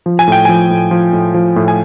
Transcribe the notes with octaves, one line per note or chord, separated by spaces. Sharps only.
F3
G#5
A2 G5
F3 G#5
A2
F3
A2
F3
A2
G#5